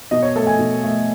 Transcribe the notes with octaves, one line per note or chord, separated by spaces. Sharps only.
B2 D#5
C#5
A3 A4
G#5
B2
A3